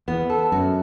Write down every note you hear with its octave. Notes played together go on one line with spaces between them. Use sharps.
E2 B3
A4
F#2 F#4